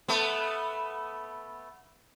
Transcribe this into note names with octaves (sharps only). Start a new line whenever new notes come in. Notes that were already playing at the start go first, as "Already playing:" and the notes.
A3 B3